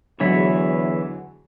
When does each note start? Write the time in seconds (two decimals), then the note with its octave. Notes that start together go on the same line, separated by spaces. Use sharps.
0.20 E2 D3 E3 F#3 G#3 C#5 E5